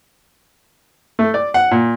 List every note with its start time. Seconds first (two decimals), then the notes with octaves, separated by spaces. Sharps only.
1.19 A3
1.34 D5
1.54 F#5
1.71 A#2